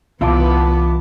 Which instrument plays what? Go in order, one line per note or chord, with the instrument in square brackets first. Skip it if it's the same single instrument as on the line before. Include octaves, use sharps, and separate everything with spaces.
[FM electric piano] C2 A5 D6 [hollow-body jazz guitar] E3 E4 F4 [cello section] B3